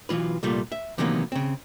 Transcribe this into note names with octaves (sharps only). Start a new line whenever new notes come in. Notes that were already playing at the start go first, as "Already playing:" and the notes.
B1 E3 F4 B4
C2 A#2 G3 A3 F4
E5
C3 D#3 E3 F#3 A#3 B3
C#3 C4